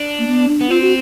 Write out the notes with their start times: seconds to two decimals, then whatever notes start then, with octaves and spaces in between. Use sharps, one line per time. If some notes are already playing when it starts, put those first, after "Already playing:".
Already playing: D4
0.19 A#3
0.28 B3
0.48 D4
0.61 B3
0.69 C4 F4
0.81 F#4